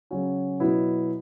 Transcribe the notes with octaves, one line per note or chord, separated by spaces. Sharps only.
C#3 F#3 C#4 F#4
B2 F#3 B3 E4